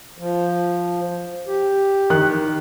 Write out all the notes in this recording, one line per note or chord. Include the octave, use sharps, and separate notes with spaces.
F3
G4
D#3 F#6